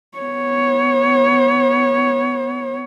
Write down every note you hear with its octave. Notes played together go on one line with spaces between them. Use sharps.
B3 C#5